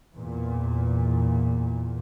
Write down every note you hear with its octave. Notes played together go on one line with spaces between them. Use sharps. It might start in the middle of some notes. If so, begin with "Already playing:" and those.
E2 A#2